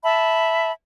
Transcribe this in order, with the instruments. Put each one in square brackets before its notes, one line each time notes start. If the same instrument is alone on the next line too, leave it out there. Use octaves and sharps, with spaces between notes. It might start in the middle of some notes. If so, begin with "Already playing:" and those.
[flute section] E5 A5 B5